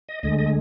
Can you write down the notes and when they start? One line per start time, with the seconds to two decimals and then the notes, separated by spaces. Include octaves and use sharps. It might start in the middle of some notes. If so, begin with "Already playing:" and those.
0.09 D#5
0.23 D2 D3 G#3 D#5
0.39 D#5